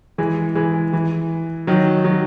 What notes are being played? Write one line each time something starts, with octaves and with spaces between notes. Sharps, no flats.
E3 G#3
E3 G#3
E3
D#3 F#3
D#3 F#3